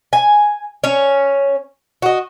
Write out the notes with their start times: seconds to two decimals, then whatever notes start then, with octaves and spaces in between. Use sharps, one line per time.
0.13 G#5
0.84 C#4 C#5
2.02 F#4 D#5